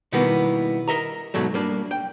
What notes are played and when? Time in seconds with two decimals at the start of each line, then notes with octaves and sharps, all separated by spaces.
0.12 B2 D#3 G3 A#3 B3 E4
0.88 A#4 D#5 E5 A#5
1.34 G#2 B2 F#3 A3
1.54 G3 A#3 D4
1.91 G5